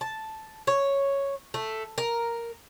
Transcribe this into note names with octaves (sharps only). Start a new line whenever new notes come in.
A5
C#5
A3
A#4